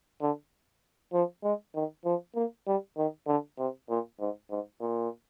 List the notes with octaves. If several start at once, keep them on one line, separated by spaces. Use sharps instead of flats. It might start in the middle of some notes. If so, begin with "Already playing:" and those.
D3
F3
G#3
D#3
F3
A#3
G3
D#3
D3
C3
A#2
G#2
G#2
A#2